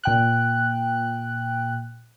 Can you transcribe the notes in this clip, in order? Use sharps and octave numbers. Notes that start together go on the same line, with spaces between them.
A#2 G5 F#6